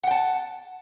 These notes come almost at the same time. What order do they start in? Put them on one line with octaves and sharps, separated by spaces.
F#5 G5 A5